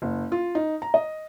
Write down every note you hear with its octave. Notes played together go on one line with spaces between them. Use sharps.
F#1
F4
D#4
A#5
D#5